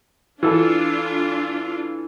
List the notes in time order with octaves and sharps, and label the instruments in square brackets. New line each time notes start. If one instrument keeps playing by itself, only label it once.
[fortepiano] E3 A4 [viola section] D4 F4